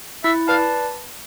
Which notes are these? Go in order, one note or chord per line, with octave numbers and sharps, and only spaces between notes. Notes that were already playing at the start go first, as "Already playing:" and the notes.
E4 E5
B4 D5 F5 A5